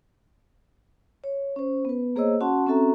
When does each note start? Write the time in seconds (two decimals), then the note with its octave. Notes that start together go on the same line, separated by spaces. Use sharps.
1.24 C#5
1.56 C#4 C5
1.85 B3 B4
2.16 A#3 G#4 C5 C#5 D#5 E6
2.41 C#4 F#4 F#5 A5 C6
2.66 C4 C#4 F#4 A4 E5 A#5